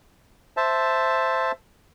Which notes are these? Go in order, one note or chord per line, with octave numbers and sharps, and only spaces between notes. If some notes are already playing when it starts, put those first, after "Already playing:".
C5 E5 A5